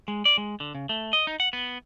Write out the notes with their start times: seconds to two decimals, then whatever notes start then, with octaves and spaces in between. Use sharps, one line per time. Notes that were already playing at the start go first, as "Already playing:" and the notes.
0.08 G#3
0.25 D5
0.38 G#3
0.60 D3
0.75 C#3
0.89 A3
1.13 D#5
1.27 D#4
1.40 F#5
1.53 B3